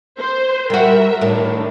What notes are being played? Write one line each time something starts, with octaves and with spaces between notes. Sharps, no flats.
C5
G3 F#4 A#4 E5
A2 D#3 D4